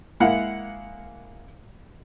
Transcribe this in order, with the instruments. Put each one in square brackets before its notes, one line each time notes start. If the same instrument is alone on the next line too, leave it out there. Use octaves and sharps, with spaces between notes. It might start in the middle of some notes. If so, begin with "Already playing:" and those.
[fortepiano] G#3 A#3 E4 F5 F#5